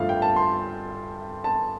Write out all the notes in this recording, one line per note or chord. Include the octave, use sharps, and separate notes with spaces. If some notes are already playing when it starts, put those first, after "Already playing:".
Already playing: G2 F3 A3 F5
G5
A5
C6
A5